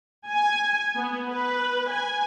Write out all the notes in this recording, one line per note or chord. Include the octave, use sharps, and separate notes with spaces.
G#5
B3
B4
G#5